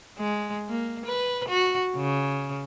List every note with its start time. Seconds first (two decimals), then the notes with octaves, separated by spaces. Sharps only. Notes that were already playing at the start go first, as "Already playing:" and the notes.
0.18 G#3
0.69 A#3
1.06 B4
1.49 F#4
1.97 C#3